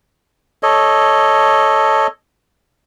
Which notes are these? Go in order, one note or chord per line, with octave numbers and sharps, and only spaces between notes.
A4 C#5 D#5